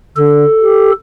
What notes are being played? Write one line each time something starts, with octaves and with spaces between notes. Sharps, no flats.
D3 A4
G4